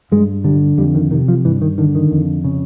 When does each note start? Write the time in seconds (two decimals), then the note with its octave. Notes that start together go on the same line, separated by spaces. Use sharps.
0.12 G2 G#3
0.44 D3 G3
0.78 F2 G3
0.95 D#3
1.11 C3 D#3
1.28 F3
1.45 G2 E3
1.62 D#3
1.78 D3 D#3
1.95 D#3
2.12 F2
2.44 C#3